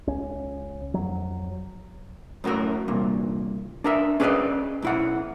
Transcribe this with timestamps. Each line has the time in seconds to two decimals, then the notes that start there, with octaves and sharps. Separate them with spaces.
0.07 C#2 C#4
0.94 F2 F#3
2.44 F#2 A2 F#4 A#4
2.88 C2 G2 A#2
3.84 D4 A#4 E5
4.20 C#4 G#4 B4 C5 D5 D#5
4.82 B1 E4 F#5